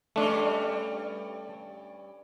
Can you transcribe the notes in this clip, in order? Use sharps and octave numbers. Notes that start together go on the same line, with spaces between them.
G2 G3 A3 C#4 D4